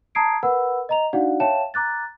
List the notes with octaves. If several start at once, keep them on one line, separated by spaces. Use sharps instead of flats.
A5 A#5 D#6 G#6 C7 D7
A#4 B4 F#5 B5 E6
D#5 A#5 F7
D4 D#4 F#4 D5 F5 F#5
C#5 E5 F5 G5 A5 E7
A#5 D6 F#6 A6